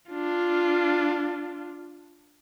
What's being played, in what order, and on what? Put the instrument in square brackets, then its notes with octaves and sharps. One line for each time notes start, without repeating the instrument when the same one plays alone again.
[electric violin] D4 F4